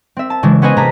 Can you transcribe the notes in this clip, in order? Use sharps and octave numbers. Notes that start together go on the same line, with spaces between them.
C4 E5
A5
C#3 E3 G#3 D4
B3 C#4 B4 C5 D#5 G#5
C3 A#3 G#4 A5 A#5 B6